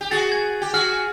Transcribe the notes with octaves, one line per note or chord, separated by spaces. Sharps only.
G4
F#4 G#4 A6
G#6
G4
F#4 G#4 F6